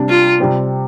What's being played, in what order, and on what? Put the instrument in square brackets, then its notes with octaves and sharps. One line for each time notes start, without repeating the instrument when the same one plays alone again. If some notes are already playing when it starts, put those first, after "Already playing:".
Already playing: [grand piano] C3 G3 D4
[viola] F4
[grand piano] C3 G3 C4